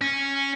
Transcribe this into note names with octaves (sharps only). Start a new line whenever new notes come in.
C#4